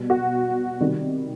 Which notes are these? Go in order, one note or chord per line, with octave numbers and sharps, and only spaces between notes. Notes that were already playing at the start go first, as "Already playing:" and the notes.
Already playing: B2 G3
F#4
C3 D#3 G3